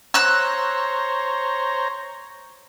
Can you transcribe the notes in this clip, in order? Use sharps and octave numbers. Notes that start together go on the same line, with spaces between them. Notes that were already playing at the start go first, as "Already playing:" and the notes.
C5 C#5 A#5 E6 F#6